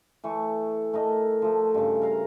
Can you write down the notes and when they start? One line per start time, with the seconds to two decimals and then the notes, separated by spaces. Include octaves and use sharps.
0.24 E3 A3 C#6
0.93 A3 A#4 D#5
1.42 F3 A3
1.74 G2 C#3
2.02 A#4 F5 A#5